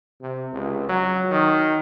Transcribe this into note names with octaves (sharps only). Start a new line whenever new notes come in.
C3
C#2
F#3
D#3